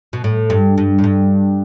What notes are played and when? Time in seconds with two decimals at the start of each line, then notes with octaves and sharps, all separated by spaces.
0.13 B2
0.24 A2
0.50 G2
0.78 G2
0.99 A2
1.04 G2